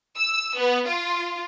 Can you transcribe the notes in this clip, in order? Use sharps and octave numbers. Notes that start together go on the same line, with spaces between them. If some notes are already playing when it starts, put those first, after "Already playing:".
E6
B3
F4